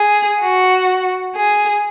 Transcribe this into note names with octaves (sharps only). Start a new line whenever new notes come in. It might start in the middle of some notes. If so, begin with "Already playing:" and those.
Already playing: G#4
F#4
G#4